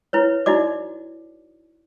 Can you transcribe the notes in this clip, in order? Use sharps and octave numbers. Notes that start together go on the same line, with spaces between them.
E4 B4 C#5
D#4 E4 F#4 D5 D6